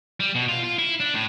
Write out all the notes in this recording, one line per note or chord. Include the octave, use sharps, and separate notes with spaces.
G3
B2
F4
F4
E4
D4
A2